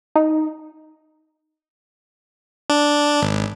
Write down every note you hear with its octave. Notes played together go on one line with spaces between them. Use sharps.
D#4
D4
G#1